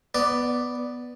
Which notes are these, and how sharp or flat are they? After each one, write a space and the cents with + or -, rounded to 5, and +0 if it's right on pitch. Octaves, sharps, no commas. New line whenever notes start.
B3 +0 D5 +0